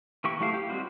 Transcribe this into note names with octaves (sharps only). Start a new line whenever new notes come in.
E3 A#3 G4 C#6
F#3 A3 E4 G4 F5
G4
G3 G#3 C4 F4 F#4